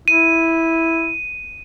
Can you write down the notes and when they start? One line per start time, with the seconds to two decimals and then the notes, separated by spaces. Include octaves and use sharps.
0.08 E4 D#7